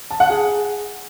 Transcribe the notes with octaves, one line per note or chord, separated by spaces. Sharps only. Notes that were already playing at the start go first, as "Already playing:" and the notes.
A5
F#5
G#4